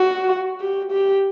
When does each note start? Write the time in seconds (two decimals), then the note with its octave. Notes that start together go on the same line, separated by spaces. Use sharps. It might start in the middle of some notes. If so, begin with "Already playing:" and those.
Already playing: F#4
0.61 G4
0.92 G4